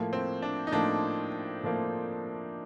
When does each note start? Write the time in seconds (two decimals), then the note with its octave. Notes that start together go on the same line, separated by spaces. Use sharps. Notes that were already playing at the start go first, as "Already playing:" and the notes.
Already playing: A2 F3 A#3
0.13 C4
0.42 D4
0.67 D#4
0.72 A2 F3 A#3 D4
1.63 A2 F3 A#3